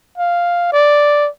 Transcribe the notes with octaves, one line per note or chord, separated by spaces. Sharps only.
F5
D5